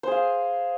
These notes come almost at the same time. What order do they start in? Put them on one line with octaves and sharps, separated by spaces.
C5 G#4 F5 G#5